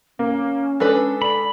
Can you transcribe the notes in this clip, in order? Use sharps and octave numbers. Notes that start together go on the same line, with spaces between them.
A#3 C#4
G#3 D4 A4 B4
D5 B5